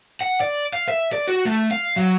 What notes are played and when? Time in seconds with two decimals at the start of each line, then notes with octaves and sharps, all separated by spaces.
0.21 F#5
0.41 D5
0.73 F5
0.89 E5
1.13 D5
1.27 F#4
1.45 A3
1.71 F5
1.96 F#3